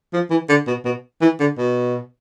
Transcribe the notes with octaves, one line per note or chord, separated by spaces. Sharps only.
F3
E3
D3
B2
B2
E3
D3
B2